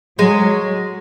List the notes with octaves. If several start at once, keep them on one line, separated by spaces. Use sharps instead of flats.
F#3 G#3